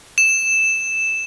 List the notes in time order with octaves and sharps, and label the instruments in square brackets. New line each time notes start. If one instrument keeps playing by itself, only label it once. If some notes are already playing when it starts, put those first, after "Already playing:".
[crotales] E7